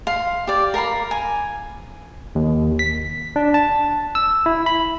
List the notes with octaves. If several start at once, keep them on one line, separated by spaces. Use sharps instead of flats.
F5 C6
G4 D5
A#4 F5 A#5 B5
G#5
D#2
B6
D4
A5
E6
E4
B5